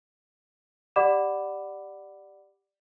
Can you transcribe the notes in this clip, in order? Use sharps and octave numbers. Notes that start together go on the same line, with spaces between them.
G4 D5 F#5 B5 D6 E7